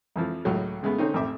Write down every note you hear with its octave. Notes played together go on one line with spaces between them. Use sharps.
F2 E3 F3
C#2 A2 F#3
C#3 G#3 A3 B3
D3 C4 C#4 D#4
A1 F2 C4 E5 D6